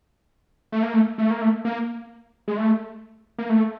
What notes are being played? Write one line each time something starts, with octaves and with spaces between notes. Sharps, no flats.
A3
A#3
A3
A3
A#3
A3
A#3
G#3
A3
A#3
A3